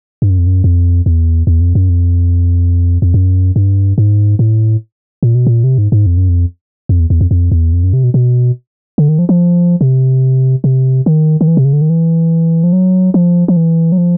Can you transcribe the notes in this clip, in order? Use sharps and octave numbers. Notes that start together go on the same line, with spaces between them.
G2
F#2
F2
F#2
F2
E2
E2
F2
F#2
F2
F2
F#2
G2
G#2
A2
A#2
B2
A#2
C3
G#2
G#2
F2
F#2
F2
F2
E2
E2
F2
F2
E2
F2
F#2
C3
B2
B2
D3
D#3
F3
F3
C3
C3
D#3
D#3
E3
C3
C#3
D3
D#3
E3
F3
F#3
F3
F3
E3
F#3
F3